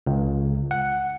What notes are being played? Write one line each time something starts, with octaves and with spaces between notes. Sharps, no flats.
C#2
F#5